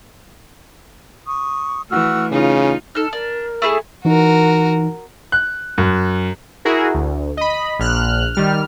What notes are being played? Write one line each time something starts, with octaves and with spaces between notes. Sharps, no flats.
C#6 D#6
E3 A3 F#4 E6 F6
C#3 D#4 F4 G#5
D#4 A4 F6
D4 A#4
A3 E4 G#4
E3 D#4 F#4 A#4
F#6
F#2
E4 F#4 G#4 A#4
D2
D#5 B5
A#1 F6 F#6
D#3 G3 F6